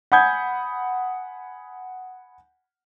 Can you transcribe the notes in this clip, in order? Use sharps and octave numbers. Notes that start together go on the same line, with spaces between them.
F#5 G#5 B5 D#6 G6 G#6